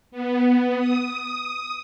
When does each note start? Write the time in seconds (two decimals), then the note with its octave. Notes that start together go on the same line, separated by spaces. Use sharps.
0.11 B3
0.77 D#6